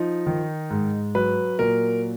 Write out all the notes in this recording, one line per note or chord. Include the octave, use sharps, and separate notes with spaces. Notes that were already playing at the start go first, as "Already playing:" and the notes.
Already playing: F3 D#4
D#3
G#2
F#3 B4
A#2 A#4